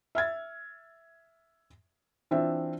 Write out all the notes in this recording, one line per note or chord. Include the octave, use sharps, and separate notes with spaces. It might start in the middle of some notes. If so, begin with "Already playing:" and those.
E5 F6 G#6 A6
E3 C4 D4 F4 E5